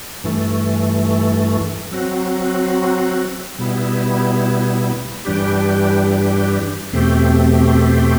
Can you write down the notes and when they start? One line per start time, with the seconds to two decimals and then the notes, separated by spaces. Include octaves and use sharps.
0.24 G2 E3 A3
1.91 F#3 C4 F#4
3.59 B2 G3 B3 E4
5.25 G2 E3 G3 D4 G4
6.93 E2 B2 A3 C4 G4